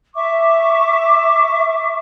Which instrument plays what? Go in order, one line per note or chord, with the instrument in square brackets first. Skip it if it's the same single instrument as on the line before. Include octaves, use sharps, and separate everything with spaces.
[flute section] E5 C#6 D6